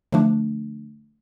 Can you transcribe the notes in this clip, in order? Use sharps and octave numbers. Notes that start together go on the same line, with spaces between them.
D3 F3 A3 D4